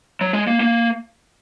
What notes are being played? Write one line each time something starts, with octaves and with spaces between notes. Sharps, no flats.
F#3
G#3
A#3
A#3